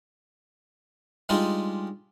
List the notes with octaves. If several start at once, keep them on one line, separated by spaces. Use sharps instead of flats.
G3 G#3 D4 D#4 F4